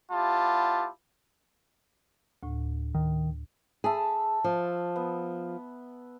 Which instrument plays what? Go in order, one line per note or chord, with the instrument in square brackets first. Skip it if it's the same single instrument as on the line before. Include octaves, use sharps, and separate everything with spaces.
[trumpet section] G3 B3 E4 F4 G4 A5
[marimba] D2 A2
[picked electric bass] D#3
[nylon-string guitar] G#4 [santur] E5 A5 B5
[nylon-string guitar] F3
[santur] B3